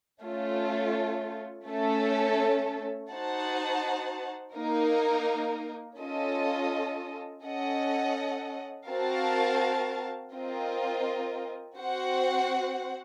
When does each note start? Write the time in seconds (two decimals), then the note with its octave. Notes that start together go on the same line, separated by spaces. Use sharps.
0.22 A3 C#4 F4 A4 C#5
1.67 A3 C#4 A4
3.11 D#4 F#4 C5 F#5 A5
4.55 A#3 D#4 A#4
6.00 C#4 F4 A4 D#5
7.44 C#4 A4 D#5 F#5
8.88 C4 F#4 A#4 F5 A5
10.32 C4 F4 A#4 D#5
11.76 C4 F#4 C5 F#5